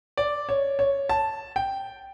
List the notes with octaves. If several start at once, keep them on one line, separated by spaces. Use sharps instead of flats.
D5
C#5
C#5
A5
G5